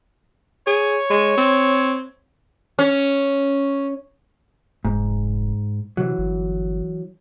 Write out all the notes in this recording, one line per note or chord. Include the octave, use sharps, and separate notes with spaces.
G#4 C#5
G#3
C4
C#4
F1 G#2
C3 E3 F#3
G1